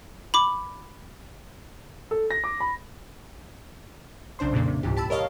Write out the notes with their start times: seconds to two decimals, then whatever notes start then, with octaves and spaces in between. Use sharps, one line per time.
0.34 B5 D6
2.11 A4
2.31 A#6
2.44 D6
2.60 B5
4.39 B1 C#3 D4 C5 C6
4.52 F2 A#2 C#3 A#3
4.68 C3
4.83 C#2 G#2 E3 G4
4.97 G4 A5 B5 E6
5.10 A#4 C#5 D#5 F5